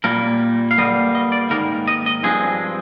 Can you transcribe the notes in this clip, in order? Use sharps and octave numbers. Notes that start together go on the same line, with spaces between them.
A#2 G3 A#3 A#4
F5
G2 D3 G3 A#3 D#5
D#5
D5
G#2 D#3 A#3 A#4
D#5
D#5
G2 F3 G#3 C4 G#4